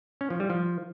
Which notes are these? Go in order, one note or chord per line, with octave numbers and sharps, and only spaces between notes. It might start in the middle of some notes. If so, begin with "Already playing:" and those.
C#4
F3
G3
F3